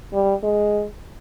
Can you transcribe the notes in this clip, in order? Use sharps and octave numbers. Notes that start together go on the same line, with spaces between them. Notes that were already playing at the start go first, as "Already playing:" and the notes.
G3
G#3